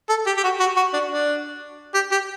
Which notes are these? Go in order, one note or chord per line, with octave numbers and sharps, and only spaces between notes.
A4
G4
G4
F#4
F#4
F#4
D4
D4
G4
G4